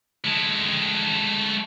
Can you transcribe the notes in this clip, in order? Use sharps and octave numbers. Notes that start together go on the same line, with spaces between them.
G#3 A3